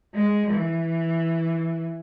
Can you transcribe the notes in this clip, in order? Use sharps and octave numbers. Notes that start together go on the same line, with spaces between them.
G#3
E3